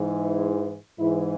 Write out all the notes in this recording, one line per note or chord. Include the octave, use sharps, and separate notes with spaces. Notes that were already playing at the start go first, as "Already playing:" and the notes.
Already playing: G#2 E3
G#2 E3 E4